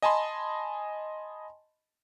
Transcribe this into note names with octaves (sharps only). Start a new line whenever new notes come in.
D#5 G#5 A5 B5 C6